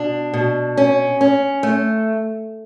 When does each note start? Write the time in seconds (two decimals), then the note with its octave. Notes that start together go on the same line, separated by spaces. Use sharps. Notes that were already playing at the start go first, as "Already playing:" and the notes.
Already playing: B2 D4
0.34 B2
0.77 C#4
1.21 C#4
1.63 A3